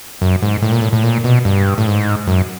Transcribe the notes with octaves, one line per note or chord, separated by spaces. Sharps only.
F#2
G#2
A2
A#2
A2
A2
A#2
B2
G2
A2
G#2
F#2